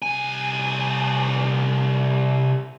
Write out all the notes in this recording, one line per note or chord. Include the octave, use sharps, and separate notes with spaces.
C2 G#5